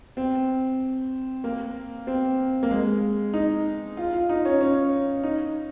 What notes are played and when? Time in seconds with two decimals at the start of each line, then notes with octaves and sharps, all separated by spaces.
0.17 C4
1.44 A#3
2.07 C4
2.63 A#3
2.71 G#3
3.34 D#4
3.97 F4
4.13 F4
4.29 D#4
4.45 C#4
4.61 C#4
5.23 D#4